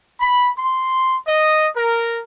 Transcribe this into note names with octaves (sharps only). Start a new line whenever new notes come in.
B5
C6
D#5
A#4